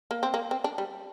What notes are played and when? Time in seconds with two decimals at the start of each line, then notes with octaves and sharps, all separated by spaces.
0.11 A#3
0.23 C4
0.34 A#3
0.51 C4
0.64 D4
0.78 G3